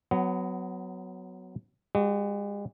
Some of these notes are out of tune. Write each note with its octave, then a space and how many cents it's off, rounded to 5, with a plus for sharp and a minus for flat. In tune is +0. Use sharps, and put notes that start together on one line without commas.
F#3 +0 B3 +25
G#3 -40 F#4 +30